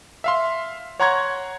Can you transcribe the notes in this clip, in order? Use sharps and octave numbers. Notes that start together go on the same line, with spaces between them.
E5 F5 C6
C#5 F#5 A#5 C6 C#6 G#6